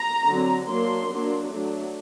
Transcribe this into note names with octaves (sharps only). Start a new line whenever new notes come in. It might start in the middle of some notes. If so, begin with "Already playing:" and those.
Already playing: A#5
D3 F#3 C4
F#3 A#3 D4 C6
F#3 A#3 D4
F#3 A3 D4